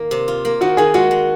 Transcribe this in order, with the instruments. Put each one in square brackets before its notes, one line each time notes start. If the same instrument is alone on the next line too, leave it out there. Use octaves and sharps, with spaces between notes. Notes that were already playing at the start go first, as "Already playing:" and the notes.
Already playing: [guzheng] D#3 A#3
C3
F4
A#3
[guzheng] D#3 [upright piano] F#4
[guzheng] D#3 [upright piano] G#4
[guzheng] G#3 [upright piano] F#4
[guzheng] G#3